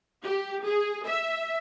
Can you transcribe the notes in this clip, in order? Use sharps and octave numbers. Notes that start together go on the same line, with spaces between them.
G4
G#4
E5